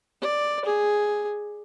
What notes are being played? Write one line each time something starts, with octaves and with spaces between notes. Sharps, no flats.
D5
G#4